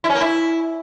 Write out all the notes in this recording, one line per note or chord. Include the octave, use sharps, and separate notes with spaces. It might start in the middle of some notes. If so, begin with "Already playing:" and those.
E4
C#4
A#3
E4